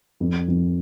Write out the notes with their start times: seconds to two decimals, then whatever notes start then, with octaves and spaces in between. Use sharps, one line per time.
0.20 F2
0.48 F2